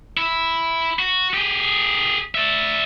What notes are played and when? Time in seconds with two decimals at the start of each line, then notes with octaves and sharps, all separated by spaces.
0.17 E4
0.99 F#4
1.34 G4 G#4
2.35 D5 E5